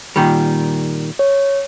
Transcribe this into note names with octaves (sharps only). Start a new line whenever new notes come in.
A#2 D#3 G3
C#5